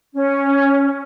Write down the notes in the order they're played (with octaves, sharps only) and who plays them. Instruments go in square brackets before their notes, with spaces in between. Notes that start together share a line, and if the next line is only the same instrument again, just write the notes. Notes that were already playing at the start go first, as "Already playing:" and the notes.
[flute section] C#4